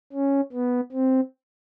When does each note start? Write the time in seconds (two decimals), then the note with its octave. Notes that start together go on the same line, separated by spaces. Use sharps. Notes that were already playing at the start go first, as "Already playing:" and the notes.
0.12 C#4
0.53 B3
0.92 C4